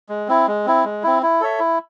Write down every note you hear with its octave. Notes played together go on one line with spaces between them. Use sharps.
G#3
C4 E4
G#3
C4 E4
G#3
C4 E4
E4
A4 C#5 E5
E4